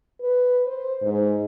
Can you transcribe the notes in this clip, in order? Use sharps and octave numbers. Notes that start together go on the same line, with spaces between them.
B4
C5
G#2